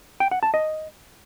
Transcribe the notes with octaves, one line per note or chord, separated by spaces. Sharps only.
G5
F#5
A5
D#5